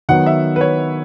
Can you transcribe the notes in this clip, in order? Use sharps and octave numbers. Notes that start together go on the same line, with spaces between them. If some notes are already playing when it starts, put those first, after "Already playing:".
D#3 F#3 B3 F#5
E5
B4
C#5